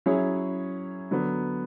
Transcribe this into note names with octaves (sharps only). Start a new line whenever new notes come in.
F#3 C#4 E4 G#4 C#5
D3 F#3 B3